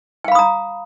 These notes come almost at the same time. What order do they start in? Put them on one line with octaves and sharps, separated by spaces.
G5 F5 B5 D#6 A#5